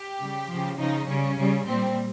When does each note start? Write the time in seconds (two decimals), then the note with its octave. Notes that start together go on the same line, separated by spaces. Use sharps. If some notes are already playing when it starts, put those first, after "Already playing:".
Already playing: G4
0.19 C#3 G3
0.48 C#3 F3
0.78 C#3 F3 D#4
1.07 C#3 G3 C#4
1.37 C#3 G3
1.66 A#2 G3 C4